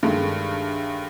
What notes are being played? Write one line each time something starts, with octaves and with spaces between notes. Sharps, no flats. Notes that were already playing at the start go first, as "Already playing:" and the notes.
G2 D#3 G#3 A3